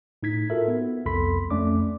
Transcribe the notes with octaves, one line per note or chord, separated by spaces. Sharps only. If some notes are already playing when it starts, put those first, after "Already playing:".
A2 D#4 G#6 B6
F4 F#4 A4 A#4 E5
B3
C2 F2 A4 B5 C6 B6
F2 A3 C#4 D5 D6